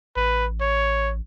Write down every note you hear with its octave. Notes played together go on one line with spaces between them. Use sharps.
A1 B4
C#5